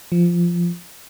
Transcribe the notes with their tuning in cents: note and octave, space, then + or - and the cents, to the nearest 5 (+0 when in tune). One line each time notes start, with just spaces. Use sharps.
F3 -10